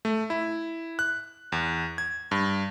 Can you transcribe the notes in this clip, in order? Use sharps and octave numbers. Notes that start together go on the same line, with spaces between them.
A3
E4
F#6
E2
G#6
G2